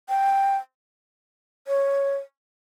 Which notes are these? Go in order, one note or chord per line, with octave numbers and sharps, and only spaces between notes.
G5
C#5